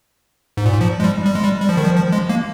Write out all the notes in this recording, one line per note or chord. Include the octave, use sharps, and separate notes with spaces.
G#2
A#2
G#2
F3
G#3
G3
G3
G#3
G3
G3
F3
D#3
F3
F3
G#3
A#3